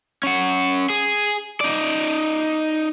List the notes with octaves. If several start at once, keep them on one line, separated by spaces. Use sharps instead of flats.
C#4 F#5
G#4
D#4 D5